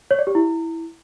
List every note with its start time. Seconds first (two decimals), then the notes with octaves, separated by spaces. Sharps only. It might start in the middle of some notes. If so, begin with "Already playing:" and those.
0.11 C#5
0.19 D5
0.27 G4
0.35 E4